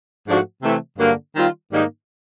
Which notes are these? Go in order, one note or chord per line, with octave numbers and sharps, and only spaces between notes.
G#2 F3 A3 D4 F#4
C3 E3 A3
G2 D3 F#3 A#3
D#3 G3 C4 F4
G#2 D#3 G3 A#3 D#4